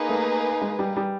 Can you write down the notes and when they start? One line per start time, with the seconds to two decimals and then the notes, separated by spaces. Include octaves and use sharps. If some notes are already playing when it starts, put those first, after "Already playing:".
Already playing: A#3 D#4 G#4 B4
0.09 A3
0.61 G#3
0.79 G3
0.97 G3